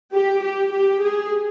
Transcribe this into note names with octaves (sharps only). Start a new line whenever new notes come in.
G4
G4
G4
G#4